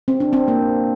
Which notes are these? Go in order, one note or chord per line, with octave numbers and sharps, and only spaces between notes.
C4
D4
C4
A#3